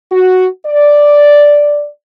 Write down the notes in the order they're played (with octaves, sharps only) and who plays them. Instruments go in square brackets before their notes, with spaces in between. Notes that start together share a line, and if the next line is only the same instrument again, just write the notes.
[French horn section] F#4
D5